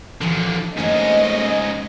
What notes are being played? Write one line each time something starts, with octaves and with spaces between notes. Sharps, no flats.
A#2 D3 E3 F3
G#2 A3 A#3 C#4 D4 D#5